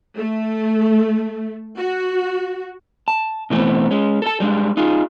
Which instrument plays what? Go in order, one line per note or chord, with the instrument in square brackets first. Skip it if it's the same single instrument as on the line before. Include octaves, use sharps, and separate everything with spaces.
[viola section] A3
F#4
[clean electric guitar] A5
B2 E3 A3 B3 C4
G#3 C#4
A4 A5
G3 G#3 D4
D#4 F4 G#4